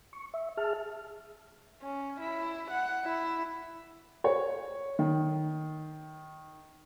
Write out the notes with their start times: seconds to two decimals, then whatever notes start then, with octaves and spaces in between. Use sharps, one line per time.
0.13 C#6
0.34 E5
0.57 G#4 E5 A5 F6
1.82 C#4
2.20 E4
2.71 F#5
3.05 E4
4.24 C#5
4.99 D#3